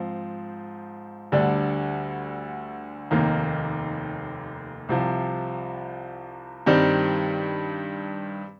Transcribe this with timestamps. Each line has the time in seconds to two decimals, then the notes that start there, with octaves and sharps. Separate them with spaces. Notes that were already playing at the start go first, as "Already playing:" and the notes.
Already playing: G#2 F3 C4
1.32 D2 D3 G3 D4
3.11 F1 D#2 D#3 A#3
4.89 C2 C3 F3
6.66 G2 D#3 G3 C4